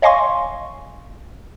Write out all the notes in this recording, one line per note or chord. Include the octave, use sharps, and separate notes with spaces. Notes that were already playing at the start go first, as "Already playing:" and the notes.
C#5 D#5 F5 G#5 C6 C#6